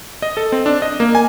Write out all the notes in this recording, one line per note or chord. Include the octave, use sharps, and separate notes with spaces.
D#5
A4
C4
D4
D#5
A#3
G#5